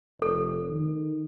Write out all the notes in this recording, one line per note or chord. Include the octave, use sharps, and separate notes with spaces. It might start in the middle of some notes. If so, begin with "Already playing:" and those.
F1 A4
D#3